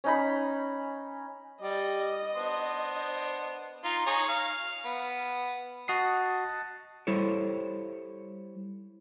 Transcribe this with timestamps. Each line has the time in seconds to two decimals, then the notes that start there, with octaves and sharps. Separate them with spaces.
0.04 C#4 D#4 B5
1.61 G3 D5 D#5
2.35 B3 D4 C5
3.84 D#4 F4
4.07 D#4 G#4 C#5
4.29 F5
4.85 B3
5.88 F#4 D#5 F#5 A5 D#6 C7
7.07 G3 E4 A4 C5 C#5